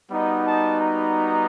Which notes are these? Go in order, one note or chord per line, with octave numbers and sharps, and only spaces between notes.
G3 B3 D#4 F#4
A5
A#5